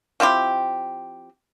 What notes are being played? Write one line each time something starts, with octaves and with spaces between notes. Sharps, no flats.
F3 C4 E4 G4